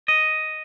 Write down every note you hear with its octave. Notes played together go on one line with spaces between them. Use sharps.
D#5